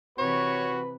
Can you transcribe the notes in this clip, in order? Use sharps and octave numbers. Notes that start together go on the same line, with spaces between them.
C3 E3 F#4 B4 C#5